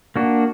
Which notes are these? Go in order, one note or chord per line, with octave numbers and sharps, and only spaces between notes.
A#3 D4 F#4